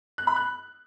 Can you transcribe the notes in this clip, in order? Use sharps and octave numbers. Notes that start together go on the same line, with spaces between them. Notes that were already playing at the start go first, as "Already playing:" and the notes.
F#6
B5
F#6